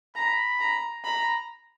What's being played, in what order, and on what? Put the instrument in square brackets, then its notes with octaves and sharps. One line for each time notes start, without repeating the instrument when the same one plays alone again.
[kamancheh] A#5 [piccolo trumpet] B5
[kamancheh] A#5
[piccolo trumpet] A#5 [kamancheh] B5